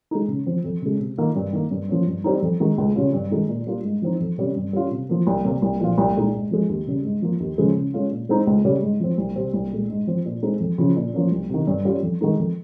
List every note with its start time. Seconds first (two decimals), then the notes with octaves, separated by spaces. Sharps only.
0.11 G#3 D#4
0.28 C#3
0.46 F3 C4
0.64 F2
0.82 C#3 G#3
1.00 C3
1.18 D#3 A#3 F4
1.35 G2
1.53 D#3 A#3
1.71 G2
1.89 F3 A#3 C#4
2.06 G2
2.24 G3 C4 D#4
2.42 F2
2.60 D#3 G#3 D#4
2.78 C#2
2.95 C#3 G3 C#4 F4
3.13 G2
3.31 D#3 G#3 D#4
3.49 A#2
3.67 G3 A#3 F4
3.84 G#2
4.02 F3 C4 D#4
4.20 F2
4.38 C3 G3 C#4
4.56 G2
4.73 G3 C#4 F4
4.91 C3
5.09 F3 A#3
5.27 C2
5.45 C3 G3 A#3
5.62 C2
5.80 A#2 F3 A#3 F4
5.98 C2
6.16 A#2 G#3 D#4
6.34 G#2
6.51 F3 G#3
6.69 D#2
6.87 C#3 G3
7.05 G#2
7.22 F3 A#3
7.40 D#2
7.58 C#3 F3 G#3
7.76 C#3
7.94 G#3 C#4 F4
8.11 A#2
8.29 G#3 C4 D#4
8.47 C#2
8.65 C#3 G3 C#4
8.83 G#2
9.00 F3 C4
9.18 C2
9.36 C3 G3 C4
9.54 C2
9.71 A#2 G#3
9.89 G#2
10.07 F3 C4
10.25 A#2
10.43 G#3 C4 D#4
10.60 F2
10.78 C#3 F3
10.96 A#2
11.14 F3 A#3 C#4
11.32 C2
11.49 C3 D#3
11.67 G2
11.85 G3 C#4 F4
12.03 F2
12.21 D#3 G#3 D#4
12.38 F2